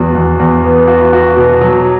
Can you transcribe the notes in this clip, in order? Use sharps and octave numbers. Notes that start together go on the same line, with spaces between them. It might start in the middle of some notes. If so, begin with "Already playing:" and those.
Already playing: E2 F#4
E2
E2
B3
F#4
F#4
B2
F#3